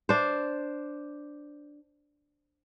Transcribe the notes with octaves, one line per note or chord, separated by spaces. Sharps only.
D4 C5